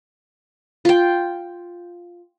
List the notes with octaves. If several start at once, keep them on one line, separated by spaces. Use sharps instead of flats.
F4 G5